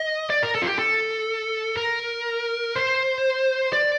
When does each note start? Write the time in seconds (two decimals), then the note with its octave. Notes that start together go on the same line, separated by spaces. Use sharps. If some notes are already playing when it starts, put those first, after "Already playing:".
Already playing: D#5
0.30 D5
0.43 A#4
0.55 A4
0.62 F4
0.67 G4
0.79 A4
1.77 A#4
2.75 C5
3.73 D5